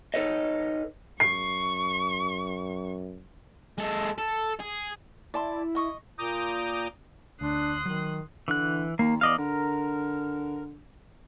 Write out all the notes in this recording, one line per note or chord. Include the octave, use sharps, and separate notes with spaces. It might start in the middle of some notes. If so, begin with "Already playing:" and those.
D#4 A4 B4 C#5 D#5
F#2 C#6 C7
G#3 A4
A4
G#4
E4 D5 A5 C6
D#5 C#6 D#6
A#2 A#5 D6 D#6 G6
D2 D4 C6 D#6 F#6
D#3 F#3
D3 E3 F#6
D#2 A#3
E2 D5 D#5 F5
D3 A#4